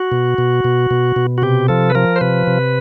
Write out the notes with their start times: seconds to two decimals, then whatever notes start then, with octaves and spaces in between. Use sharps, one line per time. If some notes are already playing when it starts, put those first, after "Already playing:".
Already playing: F#4
0.12 B2
0.38 B2
0.64 B2
0.91 B2
1.16 B2
1.38 F#4
1.42 C3 G4
1.68 F3 A4
1.90 B4
1.95 F3 A#4
2.16 C5
2.21 C3 B4
2.47 C3